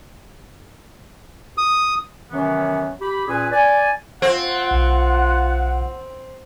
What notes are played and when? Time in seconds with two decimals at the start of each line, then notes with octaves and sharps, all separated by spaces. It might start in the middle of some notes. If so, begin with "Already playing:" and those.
1.58 D#6
2.32 C3 D#3 E3 F#3 B3 C#4
3.02 G4 B5
3.28 A#2 C#4 G#4 B4 G#5
3.52 D5 G#5
4.22 C4 F4 F#5
4.71 B1